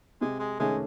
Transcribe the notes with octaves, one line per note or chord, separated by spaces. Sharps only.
C3 G#3
G#3
D#3 G#3 A3 C#4 G#4